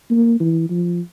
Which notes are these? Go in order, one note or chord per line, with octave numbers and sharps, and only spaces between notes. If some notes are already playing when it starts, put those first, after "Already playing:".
A#3
E3
F3